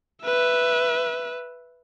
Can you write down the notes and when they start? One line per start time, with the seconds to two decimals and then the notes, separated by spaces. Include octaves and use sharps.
0.24 B4 E5